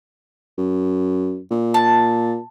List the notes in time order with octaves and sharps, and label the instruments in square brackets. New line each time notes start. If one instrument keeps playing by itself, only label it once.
[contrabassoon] F#2
A#2
[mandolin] A5